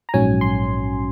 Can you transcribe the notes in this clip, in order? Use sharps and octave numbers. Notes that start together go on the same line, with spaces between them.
A#5
A#1 G#2 F#3 C#4 G#5
C6